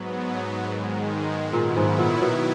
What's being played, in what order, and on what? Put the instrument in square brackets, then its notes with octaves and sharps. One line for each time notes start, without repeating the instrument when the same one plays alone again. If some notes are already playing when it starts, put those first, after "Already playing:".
Already playing: [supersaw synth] G#2 F#3 B3
G#2 D#3 G#3
[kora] A#2 [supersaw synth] D#3 F#3 B3 E4
[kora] G#2
A#2
B2